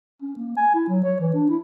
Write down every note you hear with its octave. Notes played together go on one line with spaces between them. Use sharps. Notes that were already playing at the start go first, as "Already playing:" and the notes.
C#4
A#3
G#5
E4
F#3
C#5
E3
D4
E4